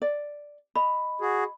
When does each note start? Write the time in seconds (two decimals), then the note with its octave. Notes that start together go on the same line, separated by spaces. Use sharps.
0.02 D5
0.76 D#5 B5
1.21 F#4 G#4